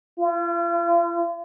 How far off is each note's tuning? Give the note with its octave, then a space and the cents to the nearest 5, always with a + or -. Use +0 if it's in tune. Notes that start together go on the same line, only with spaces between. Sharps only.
F4 -40